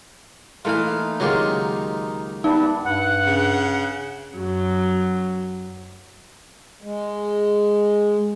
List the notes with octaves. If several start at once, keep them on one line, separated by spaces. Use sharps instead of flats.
E3 A3 A#3 D#4 F4 F5
C#2 D#3 F#3 G#3 F4 G4
G3 B3 D4 D#4
G2 F#5
C#3
F#2 F#3
G#3